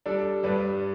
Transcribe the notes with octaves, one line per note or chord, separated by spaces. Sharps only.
G3 D4 A4
G2 G3 D4 B4